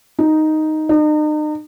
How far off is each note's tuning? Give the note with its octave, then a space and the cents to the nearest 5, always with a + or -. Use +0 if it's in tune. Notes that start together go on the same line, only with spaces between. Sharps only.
D#4 +0
D#4 -40